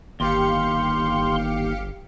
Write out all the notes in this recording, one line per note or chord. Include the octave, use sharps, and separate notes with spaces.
G1 D#2 G4 F5 C6 C#7